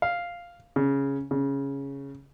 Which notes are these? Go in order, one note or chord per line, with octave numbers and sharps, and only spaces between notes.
F5
C#3
C#3